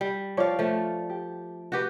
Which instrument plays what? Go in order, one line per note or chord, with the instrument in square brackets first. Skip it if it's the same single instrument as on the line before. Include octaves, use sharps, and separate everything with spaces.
[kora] G3
[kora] F3 F5 [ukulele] C#5 D5
[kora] F3 A3
[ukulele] G4
[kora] F#4 G4 B4